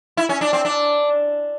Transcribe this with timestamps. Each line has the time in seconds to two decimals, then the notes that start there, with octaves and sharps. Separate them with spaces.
0.17 E4
0.29 C#4
0.41 D4
0.53 C4
0.65 D4